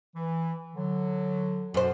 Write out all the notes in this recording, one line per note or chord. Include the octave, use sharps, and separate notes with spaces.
E3
D3 F#3
F#2 B2 F#4 C5